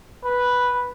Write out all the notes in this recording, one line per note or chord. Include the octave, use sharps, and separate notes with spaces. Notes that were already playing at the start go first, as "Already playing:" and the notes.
B4